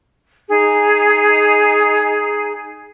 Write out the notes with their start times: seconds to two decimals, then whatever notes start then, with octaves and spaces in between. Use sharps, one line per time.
0.50 D#4 G#4